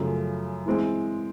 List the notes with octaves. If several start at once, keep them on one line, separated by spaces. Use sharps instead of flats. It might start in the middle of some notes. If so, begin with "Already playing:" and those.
Already playing: F#2 C#3 F3 A3
E3 G#3 C4